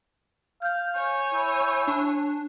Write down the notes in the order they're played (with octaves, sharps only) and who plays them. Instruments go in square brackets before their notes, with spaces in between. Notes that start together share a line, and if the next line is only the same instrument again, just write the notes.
[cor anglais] F5 [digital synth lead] G6
[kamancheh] C#5 G#5
[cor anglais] E4
[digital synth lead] D4